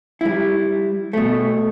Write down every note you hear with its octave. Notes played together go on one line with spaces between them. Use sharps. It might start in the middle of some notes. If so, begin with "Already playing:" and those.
G3 E4
B2 A3